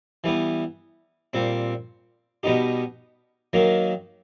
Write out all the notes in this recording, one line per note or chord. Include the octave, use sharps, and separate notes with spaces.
E3 G3 B3
A#2 G3 C4
B2 G3 B3 D#4 G4
D#3 F#3 A#3